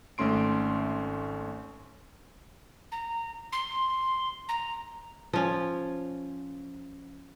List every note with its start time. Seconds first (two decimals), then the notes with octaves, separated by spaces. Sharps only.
0.18 G#1 A3 C#4 C6 D7
2.92 A#5
3.52 C6
4.49 A#5
5.33 F3 C#4